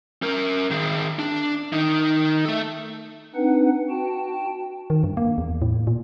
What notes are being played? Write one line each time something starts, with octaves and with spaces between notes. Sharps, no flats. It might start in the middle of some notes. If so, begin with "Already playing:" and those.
C#4 A#4
D#3 G#4
D4
D#3 D#4
A3 A4
C4 D4 D#4 B4 F#5
F#4 G5 A5
D#3
G2
A#3
E2
A2
A#2